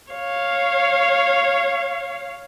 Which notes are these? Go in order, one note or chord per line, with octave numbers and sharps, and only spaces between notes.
C#5 F5